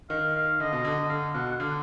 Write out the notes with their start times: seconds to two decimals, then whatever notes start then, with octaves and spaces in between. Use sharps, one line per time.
0.09 D#3 F5
0.36 F5
0.60 D3 D#5
0.73 B2
0.84 D3
0.98 D3
1.09 D3 F5
1.35 B2 F#5
1.51 F#5
1.60 D3 F5